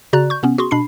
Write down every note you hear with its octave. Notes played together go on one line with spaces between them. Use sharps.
C#3 F#4 D5 A#5 F#6
C#6 G6
C3 B3 C#4
F#4 G#4 C6 C#6
B2 D4 B5 C7